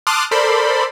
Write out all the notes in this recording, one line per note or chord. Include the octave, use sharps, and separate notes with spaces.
A5 C6 D6 D#6 F6 F#6
A4 A#4 C5 D5 B5 C6